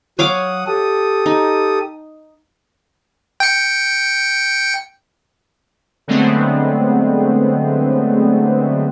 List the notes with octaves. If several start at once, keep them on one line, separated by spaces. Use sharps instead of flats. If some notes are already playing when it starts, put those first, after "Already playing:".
F#3 C#5 F5 F#5 D6 D#6
G4 A4 D#6
D#4
G5 C#7
D3 F#3 G#3 A3 B3 C4